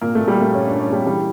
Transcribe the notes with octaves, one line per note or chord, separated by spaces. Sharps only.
A#2 A#3
A#2 A3
G3
A#2 A3
A#2 C#4
A#2 D4
C#4
A#2 G3
E3 G3